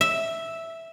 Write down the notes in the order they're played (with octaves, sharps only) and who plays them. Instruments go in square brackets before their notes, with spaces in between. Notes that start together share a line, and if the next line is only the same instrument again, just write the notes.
[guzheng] E5